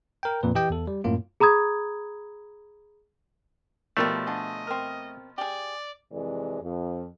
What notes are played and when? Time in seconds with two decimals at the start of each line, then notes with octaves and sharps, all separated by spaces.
0.23 A#4 G5
0.43 F2 A#2 B4
0.55 E3 G4 D#5 G5
0.70 E2 A4
0.87 G3
1.04 F#2 A2 A#3 F4
1.40 G#4 A#5 B5 D#6 G#6
3.97 B2 F3 G3 A3 A#4 D5
4.27 D3 G#4 D#5
4.67 C4 A#4
5.38 G4 G#4 D5
6.12 F2 C3 E3 G#3 D5
6.62 F2